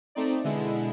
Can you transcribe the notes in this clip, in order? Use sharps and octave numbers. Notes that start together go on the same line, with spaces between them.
A3 C4 D#4 D5
B2 D3 G#3 E4